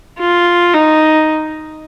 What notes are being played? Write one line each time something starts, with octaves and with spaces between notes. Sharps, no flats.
F4
D#4